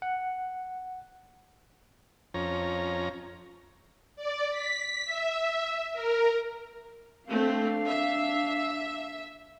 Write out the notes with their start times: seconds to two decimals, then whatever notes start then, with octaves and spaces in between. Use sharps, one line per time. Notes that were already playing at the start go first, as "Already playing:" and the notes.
0.02 F#5
2.34 F2 C#4 A#5
4.16 D5
4.51 B6
5.05 E5
5.93 A#4
7.29 A3 C4 D4 F5
7.87 E5